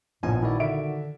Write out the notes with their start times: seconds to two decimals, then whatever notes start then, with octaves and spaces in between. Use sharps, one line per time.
0.23 A#1 A2 F3 B3 G#5
0.42 D#3 E4 F#4 D5
0.60 D3 E5 D7